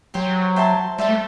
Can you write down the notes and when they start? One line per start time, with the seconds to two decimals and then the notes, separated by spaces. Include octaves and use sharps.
0.14 F#3 G4 C5 G5 C6
0.56 C5 E5 A5 C6
0.98 G3 C5 E5 A5 C6
1.08 A3